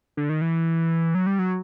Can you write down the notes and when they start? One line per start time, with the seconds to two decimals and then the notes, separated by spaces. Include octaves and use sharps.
0.17 D3
0.30 D#3
0.41 E3
1.15 F#3
1.27 G3
1.39 F#3